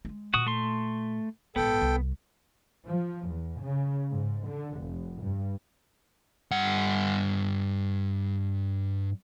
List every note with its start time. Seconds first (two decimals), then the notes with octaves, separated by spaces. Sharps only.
0.05 G#3 A#3
0.34 A#2 F#4 D#6
0.46 A3 C6
1.56 A#1 G#2 B3 A4 G5
1.81 C2
2.86 F3
3.28 E2
3.61 C#3
4.11 G#2
4.48 D3
4.79 F1
5.23 G2
6.51 G2 F#5